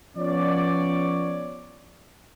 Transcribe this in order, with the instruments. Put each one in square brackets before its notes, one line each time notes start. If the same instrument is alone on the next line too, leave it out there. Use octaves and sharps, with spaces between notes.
[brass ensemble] F3 B3 C#4 C#5 D5